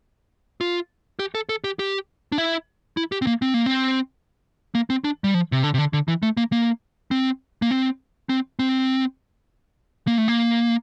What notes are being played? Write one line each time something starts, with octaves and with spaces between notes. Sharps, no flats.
F4
G4
A4
A4
G4
G4
D4
E4
E4
G4
C4
A#3
C4
A#3
C4
A#3
C4
D4
G3
F3
C3
D3
C3
D3
D3
E3
A3
A#3
A#3
C4
A#3
C4
C4
C4
A#3
A3
A#3